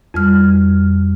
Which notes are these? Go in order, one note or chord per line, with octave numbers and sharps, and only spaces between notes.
F2 G3 F6